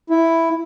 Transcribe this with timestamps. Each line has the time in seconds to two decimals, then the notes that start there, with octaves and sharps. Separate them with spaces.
0.10 E4